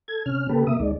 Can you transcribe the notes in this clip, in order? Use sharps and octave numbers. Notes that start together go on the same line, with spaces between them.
A4 G#6
C3 C#4 F6
C#3 A#3 G4 A4 B4
C3 A#3 E5 D#6
D2 G#3 D#4 D5